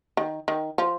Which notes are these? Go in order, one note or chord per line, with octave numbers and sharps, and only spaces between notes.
D#3
D#3
F3